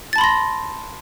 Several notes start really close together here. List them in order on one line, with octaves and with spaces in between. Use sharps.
A6 A5 B5 C6 A#6